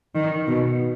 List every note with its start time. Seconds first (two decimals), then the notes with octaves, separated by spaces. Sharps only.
0.15 D#3
0.48 B2